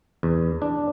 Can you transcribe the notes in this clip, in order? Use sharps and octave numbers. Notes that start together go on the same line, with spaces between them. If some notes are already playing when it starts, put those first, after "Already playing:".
E2
D4